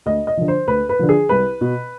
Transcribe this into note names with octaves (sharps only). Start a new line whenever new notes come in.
D2 D#5
D#5
D3 F3
C5
D2 B4
B4
D3 F3
G#4
C2 B4
B2